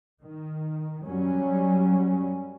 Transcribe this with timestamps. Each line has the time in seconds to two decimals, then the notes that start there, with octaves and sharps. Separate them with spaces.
0.22 D#3
1.05 F#2 F#3 G3 C#4